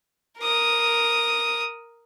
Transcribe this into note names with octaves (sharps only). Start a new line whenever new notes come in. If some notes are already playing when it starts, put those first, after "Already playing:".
A#4 D#6